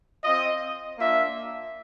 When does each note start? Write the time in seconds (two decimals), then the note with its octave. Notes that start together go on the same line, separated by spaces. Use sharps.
0.24 C4 F4 D#5
0.98 A#3 D4 F4 E5